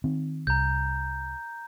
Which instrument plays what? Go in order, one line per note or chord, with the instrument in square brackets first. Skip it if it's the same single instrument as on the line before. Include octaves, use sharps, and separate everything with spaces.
[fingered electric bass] D#3 C4
[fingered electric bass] C2 [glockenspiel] A#5 G6